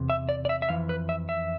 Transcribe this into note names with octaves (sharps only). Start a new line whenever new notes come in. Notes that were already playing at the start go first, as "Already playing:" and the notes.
Already playing: E2 C3
E5
D5
D5
E5
E5
F2 E3 F5
B4
E5
E5